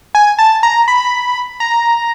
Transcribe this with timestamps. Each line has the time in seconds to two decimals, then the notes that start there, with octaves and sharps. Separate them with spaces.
0.15 G#5
0.39 A5
0.63 A#5
0.88 B5
1.60 A#5